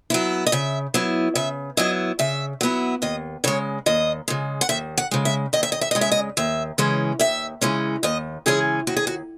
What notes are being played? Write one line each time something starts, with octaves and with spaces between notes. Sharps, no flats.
F#3 B3 E4
D#5
C#3 E5
F#3 B3 E4
C#3 E5
F#3 B3 E4 D#5
C#3 E5
F#3 B3 E4
D#2 D#5
C#3 G#3 C#5
D#2 D#5
C#3 G#3
F#5
D#2 E5
F#5
C#3 G#3
E5
D#2 D#5
E5
D#5
E5
C#3 G#3 D#5
E5
D#5
D#2 E5
C#3 E3 G#3 C#4
D#2 E5
C#3 E3 G#3 C#4
D#2 D#5
C#3 E3 G#3 C#4 G#4
D#2 F#4
G#4
F#4